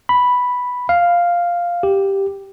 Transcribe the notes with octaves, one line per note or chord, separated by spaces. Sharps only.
B5
F5
G4